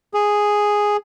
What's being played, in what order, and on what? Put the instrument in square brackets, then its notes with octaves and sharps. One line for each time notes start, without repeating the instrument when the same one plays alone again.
[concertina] G#4